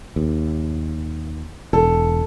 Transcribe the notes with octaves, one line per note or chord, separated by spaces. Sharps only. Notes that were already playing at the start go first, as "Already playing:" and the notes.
D#2
E1 A4